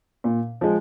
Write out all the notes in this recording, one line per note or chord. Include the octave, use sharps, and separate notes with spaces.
A#2
F3 G#3